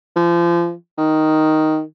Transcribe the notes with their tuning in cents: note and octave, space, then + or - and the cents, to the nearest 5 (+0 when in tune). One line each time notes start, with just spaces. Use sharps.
F3 -30
D#3 +5